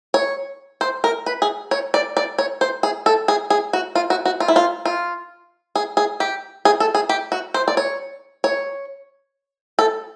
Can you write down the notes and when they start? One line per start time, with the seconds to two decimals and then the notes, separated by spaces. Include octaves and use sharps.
0.14 C#5
0.81 C5
1.04 A#4
1.26 B4
1.42 G#4
1.71 C#5
1.94 D5
2.17 D5
2.38 C#5
2.61 C5
2.83 G#4
3.06 A4
3.28 G#4
3.50 G#4
3.73 F#4
3.95 F4
4.10 F#4
4.25 F#4
4.40 F4
4.48 E4
4.56 F4
4.85 F4
5.76 G#4
5.97 G#4
6.20 G4
6.65 G#4
6.80 A4
6.95 G#4
7.09 G4
7.32 F#4
7.54 C5
7.68 D5
7.77 C#5
8.44 C#5
9.79 A4